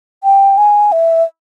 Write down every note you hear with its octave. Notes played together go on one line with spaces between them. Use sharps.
G5
G#5
E5